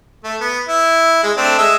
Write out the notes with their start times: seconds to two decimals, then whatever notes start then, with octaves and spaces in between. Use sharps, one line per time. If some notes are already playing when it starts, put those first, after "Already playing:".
0.24 A3
0.41 B3
0.68 E4
1.24 G#3
1.37 A3 C4 D4
1.59 G#3 D#5 E5